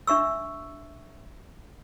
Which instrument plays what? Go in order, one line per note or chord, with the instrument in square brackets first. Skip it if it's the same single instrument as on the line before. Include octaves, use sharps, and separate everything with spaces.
[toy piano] D4 E5 C#6 E6